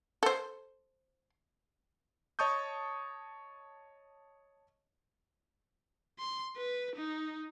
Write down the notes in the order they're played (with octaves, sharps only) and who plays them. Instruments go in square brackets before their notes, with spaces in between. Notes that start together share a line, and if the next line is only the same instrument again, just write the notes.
[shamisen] A4 C5
[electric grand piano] C#5 D#5 A5 C#6 D#6 G6
[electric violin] C6
B4
D#4